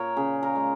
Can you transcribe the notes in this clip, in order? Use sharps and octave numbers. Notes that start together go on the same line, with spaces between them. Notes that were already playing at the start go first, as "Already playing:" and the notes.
Already playing: A#2 A#4 C#5
C#3 G#4
A#4
G#3